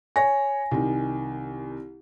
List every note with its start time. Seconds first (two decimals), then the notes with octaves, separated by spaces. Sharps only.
0.16 C#5 G#5 A#6
0.71 C2 D#3